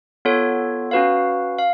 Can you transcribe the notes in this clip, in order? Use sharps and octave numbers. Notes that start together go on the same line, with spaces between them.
B3 F4 A4 C#5
C#4 F#4 B4 F5
F5